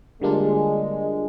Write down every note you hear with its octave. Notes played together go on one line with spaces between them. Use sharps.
D3 G3 G#3 A#3 D4 F4